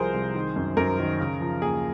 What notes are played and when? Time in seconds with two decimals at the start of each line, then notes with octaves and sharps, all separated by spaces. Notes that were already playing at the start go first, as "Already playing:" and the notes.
Already playing: C2 C3 F3 G#4 A#4 C5
0.14 C2
0.35 D#3
0.56 F#2
0.77 F#2 A#4
0.99 D#3
1.20 C#3
1.41 F3
1.62 D#2 G#4